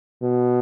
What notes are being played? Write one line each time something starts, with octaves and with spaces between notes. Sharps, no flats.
B2